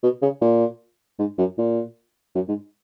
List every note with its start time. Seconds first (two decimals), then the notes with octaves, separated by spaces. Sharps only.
0.03 B2
0.22 C#3
0.41 A#2
1.19 G#2
1.38 F#2
1.58 A#2
2.35 F#2
2.48 G#2